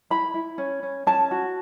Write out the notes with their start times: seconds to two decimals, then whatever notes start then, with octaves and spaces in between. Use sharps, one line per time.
0.10 E4 B5
0.34 E4
0.58 C#4
0.83 C#4
1.07 C#4 A5
1.31 F#4